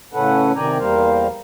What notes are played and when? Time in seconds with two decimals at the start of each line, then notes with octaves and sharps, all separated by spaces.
0.14 A2 C#3 C#4 A4 B4 F#5
0.56 C3 D#3 D5 G5 G#5 A#5
0.78 E2 G3 A#3 A#4 C5 F5